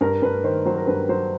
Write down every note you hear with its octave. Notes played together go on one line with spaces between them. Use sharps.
G2 A#4
G2 B4
D#3 C5
F#3 C5
A#4
G2 B4
F#3 C5